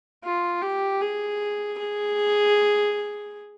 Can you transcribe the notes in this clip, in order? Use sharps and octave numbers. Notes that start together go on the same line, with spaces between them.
F4
G4
G#4
G#4